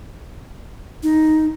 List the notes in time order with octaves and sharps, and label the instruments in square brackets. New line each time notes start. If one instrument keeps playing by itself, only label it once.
[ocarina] D#4